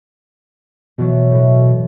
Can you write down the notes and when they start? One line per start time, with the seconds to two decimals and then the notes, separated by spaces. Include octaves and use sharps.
0.98 E2 B2 E3 F#3
1.31 A2 E3